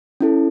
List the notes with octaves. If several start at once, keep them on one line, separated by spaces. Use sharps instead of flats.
C#4 E4 A4